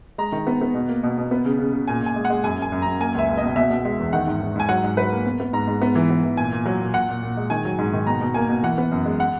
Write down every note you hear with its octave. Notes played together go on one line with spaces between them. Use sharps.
G#3 A#5
D#3
B3
B3
B2
A#3
B2
B2
B3
C#3
C#3
C#3
A#2 G#5
A#2 G#5
G#3
F#5
G#3
F#2 G#5
F#2 G#5
F#2
F#2 A#5
A#3 G#5
C#2 E5
C#2
D#5
B2
B2 E5
B2
G#3
E2
D#3 F#5
G#2
G#2
G#2 G#5
F#3 F#5
G#2
F#3 B4
A#3
B3
B3
G#2 A#5
G#2
B3
E3
B3
E3
A#2 G#5
A#2
F#3
A#2
A#2 F#5
A#2
A#2
G#3
D#3 G#5
F#3
G#2
D#3
B2 A#5
B2
A#3 G#5
B2
E3 F#5
B3
F#2
G#3
F#5